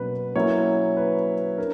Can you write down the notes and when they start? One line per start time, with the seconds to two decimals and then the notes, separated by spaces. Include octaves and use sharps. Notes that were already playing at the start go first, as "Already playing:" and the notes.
Already playing: B2 F#3 A#3 C#4 B4
0.36 F#3 A#3 C#4 E4 C#5
0.97 B4
1.58 D4 A#4